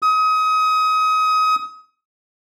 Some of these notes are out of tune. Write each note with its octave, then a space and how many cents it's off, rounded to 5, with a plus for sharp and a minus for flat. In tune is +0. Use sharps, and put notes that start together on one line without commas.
D#6 +30